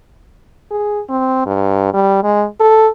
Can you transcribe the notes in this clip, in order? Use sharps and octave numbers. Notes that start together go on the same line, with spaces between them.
G#4
C4
G2
G3
G#3
A4